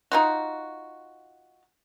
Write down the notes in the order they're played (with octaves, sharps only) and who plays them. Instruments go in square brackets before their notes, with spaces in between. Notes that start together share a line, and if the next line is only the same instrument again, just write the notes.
[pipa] D#4 F4 F#4